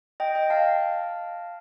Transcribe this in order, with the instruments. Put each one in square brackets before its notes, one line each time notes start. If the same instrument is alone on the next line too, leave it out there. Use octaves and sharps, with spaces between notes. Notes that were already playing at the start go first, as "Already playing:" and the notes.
[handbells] D#5 G5
D#5 G5
F5 A5